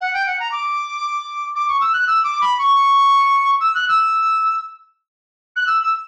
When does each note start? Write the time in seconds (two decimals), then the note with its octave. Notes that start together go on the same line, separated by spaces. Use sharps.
0.01 F#5
0.14 G5
0.27 F#5
0.40 A#5
0.52 D6
1.56 D6
1.69 C#6
1.81 E6
1.93 F#6
2.07 E6
2.24 D6
2.41 B5
2.58 C#6
3.61 E6
3.75 F#6
3.88 E6
5.56 F#6
5.67 E6
5.83 E6